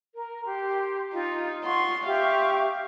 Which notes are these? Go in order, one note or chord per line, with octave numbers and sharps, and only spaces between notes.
A#4
G4 C6
D#4 F4
F4 F#5 C6 C#6
G4 E5 F5 C#6